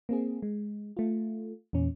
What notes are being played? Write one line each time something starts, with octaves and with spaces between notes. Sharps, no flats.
A#3 C4 G#4
G#3
A3 F4
E2 A#2 C#4